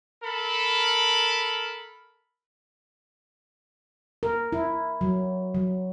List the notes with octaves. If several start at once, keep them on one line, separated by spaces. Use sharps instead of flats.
A4 A#4 B5
A#4
E4
F#3
F#3